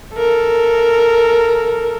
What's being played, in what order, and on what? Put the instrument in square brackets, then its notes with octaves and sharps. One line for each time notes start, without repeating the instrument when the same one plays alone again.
[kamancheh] A4 A#4